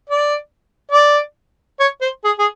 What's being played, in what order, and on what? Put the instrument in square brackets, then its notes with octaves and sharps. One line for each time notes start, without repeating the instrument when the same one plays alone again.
[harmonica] D5
D5
C#5
C5
G#4
G#4